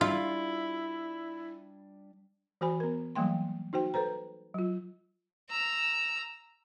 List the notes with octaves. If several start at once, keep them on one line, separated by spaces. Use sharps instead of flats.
G3 D4 E4 F4
E3 F#4 C5 G#5 B5
B3 A#4
E3 F#3 G3 A#3 G5 C6
D#4 F#4 C5 G5
A4 B4 C5 A#5
F#3 F4
A#5 E6